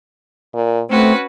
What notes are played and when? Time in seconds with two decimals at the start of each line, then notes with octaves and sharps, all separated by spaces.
0.54 A#2
0.90 A3 C4 C#4 F#4 B4